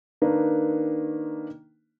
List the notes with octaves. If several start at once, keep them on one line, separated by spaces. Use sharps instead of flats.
D#3 A#3 D4 D#4 B4